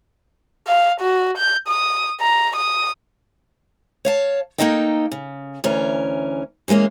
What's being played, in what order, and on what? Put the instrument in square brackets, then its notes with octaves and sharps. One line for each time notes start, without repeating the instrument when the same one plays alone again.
[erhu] F5
F#4
G6
D#6
A#5
D#6
[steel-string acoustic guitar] C#5 F5 A5
A#3 C#4 D#4 A4 D#5 G5
C#3
D2 E3 C#4 A#4
E3 G3 G#3 A#3 C#4